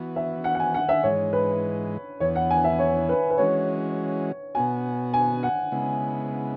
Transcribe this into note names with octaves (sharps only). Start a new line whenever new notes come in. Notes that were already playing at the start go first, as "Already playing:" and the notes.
Already playing: E3 B3 F#4
E5
F#5
F#5
G#5
F#5
E5
G#2 E3 G#3 C#5
B4
E2 E3 B3 C#5
F#5
G#5
E5
C#5
B4
B4
E3 G#3 C#4 F#4 C#5
B2 B3 F#4 G#5
G#5
F#5
C#3 G#3 B3 E4